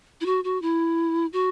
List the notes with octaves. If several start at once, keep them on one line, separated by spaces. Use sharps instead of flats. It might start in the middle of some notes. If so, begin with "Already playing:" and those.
E4
F#4
F#4
E4
F#4